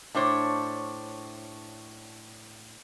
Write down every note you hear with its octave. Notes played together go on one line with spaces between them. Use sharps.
A2 D4 C5 C#5